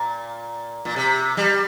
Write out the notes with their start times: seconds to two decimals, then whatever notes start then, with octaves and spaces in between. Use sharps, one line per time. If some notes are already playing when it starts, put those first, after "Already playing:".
Already playing: A#2
0.85 A#2
0.96 C3
1.37 G3